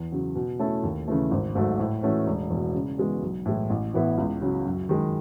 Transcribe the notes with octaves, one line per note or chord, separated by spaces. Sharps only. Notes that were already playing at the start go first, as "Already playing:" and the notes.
Already playing: E2
C#3 F#3
B2
A3 C#4 E4 A4
D#2
C#3 E3 A3
G#1
G#2 F#3 A3
A2
E3 A3 C#4 F#4
E1
E2 B2
C#3
E3 G#3 B3 F#4
B1
A2 E3 G#3
A1
A2 E3 B3 E4
C#2
C#3 F#3
F#2
D#3 G#3